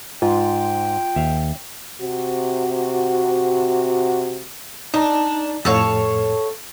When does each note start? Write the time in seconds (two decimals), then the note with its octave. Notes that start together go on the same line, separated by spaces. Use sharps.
0.22 G#2 F4 G5
1.16 D#2 E5 F5
2.01 C3 F#4
4.94 D4 D#4 A#5
5.65 F2 A2 A4 C#5 F5